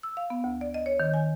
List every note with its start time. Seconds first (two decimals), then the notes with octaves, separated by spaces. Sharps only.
0.03 E6
0.17 F5
0.30 B3
0.44 D2
0.61 D5
0.74 D#5
0.86 C#5
1.00 D#3
1.14 G#5